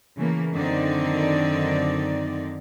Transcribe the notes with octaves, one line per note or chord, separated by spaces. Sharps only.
C#3 E3 A3 A#3
F#2 D3 D#3 C4 D#4 D5